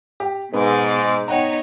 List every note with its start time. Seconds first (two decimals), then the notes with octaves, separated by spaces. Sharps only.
0.20 G4
0.53 G#2 B2 G#3 B3 D6
1.28 B3 D#4 C#5 F#5 G5 A#5